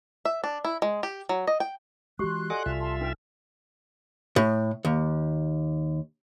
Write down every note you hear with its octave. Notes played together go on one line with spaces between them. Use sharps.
E5
D4
E4
G#3
G4
F#3
D#5
G5
E3 G#3 F#4 G4 C6 C#6 F#6
A4 D5 D#5 F#5 G#5 D6
C2 F4 E5
A5 C6
D4 D#4 B4 G5
A2
D#2